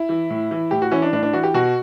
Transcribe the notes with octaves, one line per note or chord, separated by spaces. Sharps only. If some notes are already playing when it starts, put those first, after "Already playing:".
Already playing: E4
E3
A2
E3
A2 G4
F#4
E3 C#4
D4
A2 D4
D4
E3 F#4
G4
B2 F#4